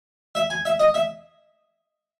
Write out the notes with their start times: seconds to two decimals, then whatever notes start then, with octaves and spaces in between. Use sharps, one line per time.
0.35 E5
0.50 G#5
0.65 E5
0.80 D#5
0.94 E5